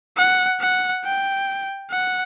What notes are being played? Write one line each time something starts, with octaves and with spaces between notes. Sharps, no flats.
F#5
F#5
G5
F#5